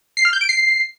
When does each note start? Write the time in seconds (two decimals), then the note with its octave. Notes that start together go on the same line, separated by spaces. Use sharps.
0.17 C7
0.25 F6
0.33 G6
0.41 D7
0.49 C7